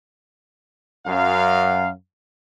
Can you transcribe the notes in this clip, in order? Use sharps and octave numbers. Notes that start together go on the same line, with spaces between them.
F#2 F5